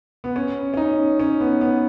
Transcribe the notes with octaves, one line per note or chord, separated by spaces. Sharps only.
B3
C#4
C#4
D#4
C#4
B3
B3